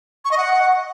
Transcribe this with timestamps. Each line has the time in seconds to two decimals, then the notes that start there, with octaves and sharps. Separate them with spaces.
0.25 C#6
0.31 D#5
0.38 F#5